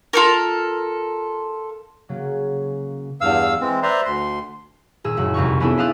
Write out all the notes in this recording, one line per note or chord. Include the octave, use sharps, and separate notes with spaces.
F4 A4 A#4
C#3 F#3 A#3 C#4
E2 G2 F5 E6
E3 G#3 C4
B4 C5 D5 E5 A#5 C6
D2 C6
D#1 G#4 E6
F#1 F#2 F#5
C2 F2 D#4 C#6
B3 C#4 D4 E4 G#4 A4
C5 E5 F5 D#6 F#6 A6